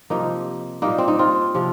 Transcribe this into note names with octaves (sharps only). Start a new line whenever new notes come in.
C3 F3 A#3 D#4
A#2 G3 A#3 D#4
C4
D#4
C4 F4
C3 F3